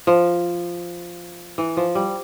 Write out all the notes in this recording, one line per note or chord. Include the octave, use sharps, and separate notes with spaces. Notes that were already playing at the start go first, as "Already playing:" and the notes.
F3
E3
F3
G3